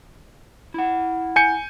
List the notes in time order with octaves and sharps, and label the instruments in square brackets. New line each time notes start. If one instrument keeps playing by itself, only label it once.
[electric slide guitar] E4 F#5
[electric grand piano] G#5 G6 C#7